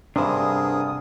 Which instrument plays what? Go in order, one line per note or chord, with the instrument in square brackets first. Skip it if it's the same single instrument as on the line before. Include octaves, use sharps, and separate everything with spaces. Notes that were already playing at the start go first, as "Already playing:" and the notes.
[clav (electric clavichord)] G2 C3 [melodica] B3 G#4 A#4 [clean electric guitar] D4 C5 [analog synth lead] D#6